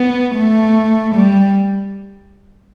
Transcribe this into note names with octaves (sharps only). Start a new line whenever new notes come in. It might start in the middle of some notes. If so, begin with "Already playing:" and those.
Already playing: B3
A3
G3